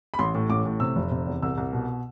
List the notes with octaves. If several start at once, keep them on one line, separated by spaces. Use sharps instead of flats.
B5
A1 C6
A2
A1 D6
A2
C3 E6
F1
C3
E2
C2 E6
C2
B2